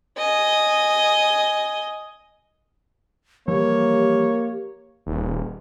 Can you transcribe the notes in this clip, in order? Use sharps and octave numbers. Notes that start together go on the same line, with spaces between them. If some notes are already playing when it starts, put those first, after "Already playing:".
D#5 G#5
E3 F3 G3 A#3 G4 C#5
D#1